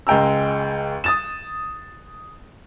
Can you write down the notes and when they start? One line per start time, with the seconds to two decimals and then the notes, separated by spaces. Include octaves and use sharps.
0.07 C#2 G#3 G5 A#5 E6
1.04 D#6 A6 E7